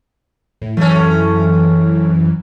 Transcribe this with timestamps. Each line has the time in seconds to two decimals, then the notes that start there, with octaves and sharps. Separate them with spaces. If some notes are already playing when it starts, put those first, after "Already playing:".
0.61 A2
0.77 F#2 E3 A3 C#4